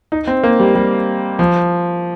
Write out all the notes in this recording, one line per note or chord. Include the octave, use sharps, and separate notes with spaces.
D#4
C4
A#3
G3
G3
F3